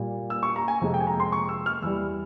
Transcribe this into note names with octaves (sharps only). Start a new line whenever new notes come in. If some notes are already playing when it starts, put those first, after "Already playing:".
Already playing: A#2 G3
E6
C#6
A#5
G#5
F2 C3 F3 G#3
G5
G#5
A#5
C6
C#6
E6
F6
E2 E3 G3 E6